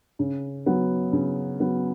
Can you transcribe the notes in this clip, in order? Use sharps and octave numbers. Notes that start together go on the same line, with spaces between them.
C#3
F#3 B3
C#3
F#3 B3